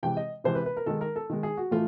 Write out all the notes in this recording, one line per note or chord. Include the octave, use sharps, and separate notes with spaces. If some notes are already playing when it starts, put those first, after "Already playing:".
C3 E3 G#3 G5
D#5
C3 E3 G#3 C5
B4
B4
A#4
D#3 G#3 A4
A#4
A4
D#3 G#3
G#4
F#4
A2 E3 A3 F4